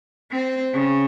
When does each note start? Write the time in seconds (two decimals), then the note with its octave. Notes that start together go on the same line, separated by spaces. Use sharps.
0.31 C4
0.73 C#3